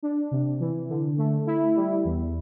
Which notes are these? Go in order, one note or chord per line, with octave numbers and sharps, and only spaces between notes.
D4
C3
E3
D3
A3
E4
G3
E2